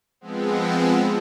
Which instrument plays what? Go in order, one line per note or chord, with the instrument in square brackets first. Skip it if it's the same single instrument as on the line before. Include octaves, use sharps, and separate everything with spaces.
[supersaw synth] F3 G#3 B3 C4